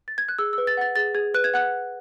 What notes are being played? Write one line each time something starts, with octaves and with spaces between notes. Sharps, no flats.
A6
G#6
F#6
G#4 E6
E6
B4
A6
F#5 A6
G#4 A6
G#4 G#6
B4 F#6
G#6
F#5 F#6